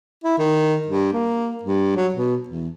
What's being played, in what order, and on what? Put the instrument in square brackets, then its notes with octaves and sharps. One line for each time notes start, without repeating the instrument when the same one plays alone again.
[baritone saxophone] E4
D#3
G2
A#3
G2
F#3
B2
E2